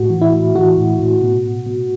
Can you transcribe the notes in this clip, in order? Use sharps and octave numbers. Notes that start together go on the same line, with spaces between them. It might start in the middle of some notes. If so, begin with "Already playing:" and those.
Already playing: A2 F#4
E3
E4
A2
E3 F#4
A2
A2
B2
B2
B2